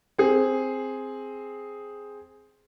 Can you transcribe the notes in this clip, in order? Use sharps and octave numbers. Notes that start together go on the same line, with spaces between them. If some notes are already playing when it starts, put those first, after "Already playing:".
C4 G#4